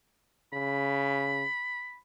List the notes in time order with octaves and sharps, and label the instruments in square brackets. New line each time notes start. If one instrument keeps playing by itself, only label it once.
[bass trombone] C#3 [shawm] B5